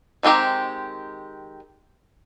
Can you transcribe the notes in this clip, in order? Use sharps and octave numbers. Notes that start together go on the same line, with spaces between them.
D#3 G#3 C4 G4 A#5